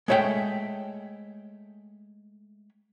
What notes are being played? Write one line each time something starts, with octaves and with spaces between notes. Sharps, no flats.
G#3 A3 C#5 E5 G5